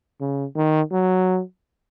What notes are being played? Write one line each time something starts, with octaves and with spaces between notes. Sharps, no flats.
C#3
D#3
F#3